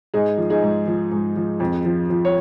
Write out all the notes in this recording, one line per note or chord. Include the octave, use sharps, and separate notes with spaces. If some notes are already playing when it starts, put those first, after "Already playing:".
G#2 D#4 G#4
F3
D#4 G#4
G#2
F3
G#2
F3
F2
F3
F3
C#5